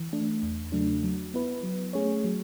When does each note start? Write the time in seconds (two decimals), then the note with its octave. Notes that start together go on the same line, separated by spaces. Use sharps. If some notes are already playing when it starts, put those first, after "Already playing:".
Already playing: E3
0.13 A3 D4
0.43 E2
0.72 C#3 F#3 A3 D4
1.03 F#3
1.34 B3 E4 B4
1.63 F#3
1.93 A3 C#4 G#4 C#5
2.24 F#3